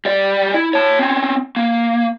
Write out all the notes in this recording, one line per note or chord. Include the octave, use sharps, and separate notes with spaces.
G3 D5
E4
C#5 A5
C4 C#4
A#3